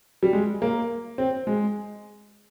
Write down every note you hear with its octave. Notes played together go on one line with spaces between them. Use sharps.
G3
G#3
A#3
C4
G#3